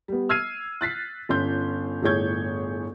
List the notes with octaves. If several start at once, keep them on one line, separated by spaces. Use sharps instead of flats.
G3 B3
E6 F6 G#6 C7 D#7
F#6 A6 B6 C7
G1 C#4 C6 G6
G1 A2 G#4 C#5 G6 G#6